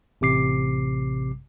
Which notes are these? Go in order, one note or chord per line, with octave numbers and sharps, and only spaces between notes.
A1 C3 D6 C7